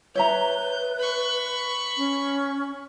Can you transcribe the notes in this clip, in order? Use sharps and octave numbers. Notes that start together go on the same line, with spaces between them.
B4 C#5 E5 A#5 G6
B5 C#6
C#4